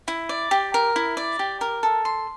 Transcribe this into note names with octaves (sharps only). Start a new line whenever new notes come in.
E4
D5
G4
A#4
E4
D5
G4
A#4
A4
C6